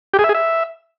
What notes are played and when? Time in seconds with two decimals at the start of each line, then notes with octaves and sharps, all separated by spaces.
0.14 G4
0.19 G#4
0.24 E5
0.29 G#4
0.35 E5